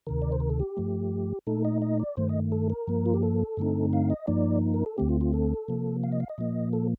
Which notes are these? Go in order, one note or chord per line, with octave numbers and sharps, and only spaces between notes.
D2 C3 D#3 A#4
D5
C5
A#4
A4
G4
G2 F3 A3
A#2 A3 D#4 A4
D#5
D#5
D5
G2 D#3 A3 C5
D#5
A4
A#4
G2 F3 A#3
F4
G4
A4
G2 D3 A3 C4 D#4
F5
D#5
G2 F3 A#3 D#4 D5
A#4
A4
D2 D3 A3 C4 G4
F4
F4
A4
C3 F3 A#3
F5
D#5
F5
D#5
A#2 F3 A#3
A4